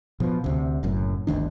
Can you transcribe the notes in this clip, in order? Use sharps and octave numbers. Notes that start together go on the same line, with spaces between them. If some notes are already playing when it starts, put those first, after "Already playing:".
B2 F3
D2 C3
F#1 F#2 A2
G1 D2 D#3 D4